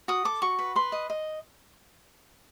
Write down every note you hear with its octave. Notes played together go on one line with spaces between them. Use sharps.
F#4 D#6
A4 D6
F#4 C#6
B4
B4 C6
D#5
D#5